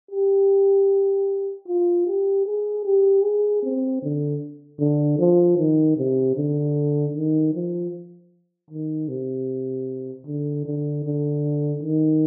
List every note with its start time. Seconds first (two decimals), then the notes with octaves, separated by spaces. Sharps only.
0.11 G4
1.68 F4
2.07 G4
2.46 G#4
2.85 G4
3.24 G#4
3.63 C4
4.02 D3
4.79 D3
5.19 F3
5.58 D#3
5.97 C3
6.36 D3
7.14 D#3
7.54 F3
8.70 D#3
9.09 C3
10.26 D3
10.66 D3
11.05 D3
11.83 D#3